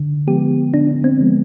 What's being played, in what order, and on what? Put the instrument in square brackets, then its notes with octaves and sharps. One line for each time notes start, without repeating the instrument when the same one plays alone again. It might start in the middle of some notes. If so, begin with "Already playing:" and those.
Already playing: [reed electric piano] D3
[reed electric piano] F3 G#3 B3 [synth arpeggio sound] G4
[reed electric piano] D3 [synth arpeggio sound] D4
[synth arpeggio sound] C4
[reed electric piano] F3 G#3 B3